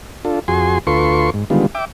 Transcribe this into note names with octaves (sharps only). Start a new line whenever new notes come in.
D4 F4 A4
F2 F#4 G#4 G#5 C6
D2 F4 A4 B4 C6 C#6
G#2
D3 D#3 G3 G#3 B3 F4
E5 G5 D6